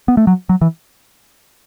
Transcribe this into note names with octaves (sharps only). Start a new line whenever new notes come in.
B3
A3
F#3
F#3
E3